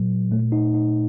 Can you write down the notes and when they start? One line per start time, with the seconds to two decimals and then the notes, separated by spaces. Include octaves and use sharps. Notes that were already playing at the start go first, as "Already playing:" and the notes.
Already playing: A#2 F#3
0.31 A#2 A3
0.52 D#4
0.74 D#4